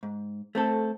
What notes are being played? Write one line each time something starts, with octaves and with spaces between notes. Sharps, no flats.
G#2
A3 C4 A4